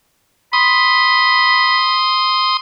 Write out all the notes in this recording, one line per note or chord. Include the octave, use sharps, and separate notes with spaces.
B5 C6 D#6